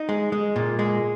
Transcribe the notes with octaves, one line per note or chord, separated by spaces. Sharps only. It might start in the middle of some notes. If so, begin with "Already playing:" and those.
Already playing: D#4
G#3
G#3
A#2
G#3